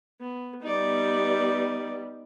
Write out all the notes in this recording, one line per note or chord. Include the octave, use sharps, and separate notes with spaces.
B3
G3 B3 D#4 D5